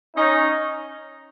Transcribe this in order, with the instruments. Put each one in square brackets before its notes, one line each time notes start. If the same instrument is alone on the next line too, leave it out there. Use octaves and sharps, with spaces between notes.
[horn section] C#4 D#4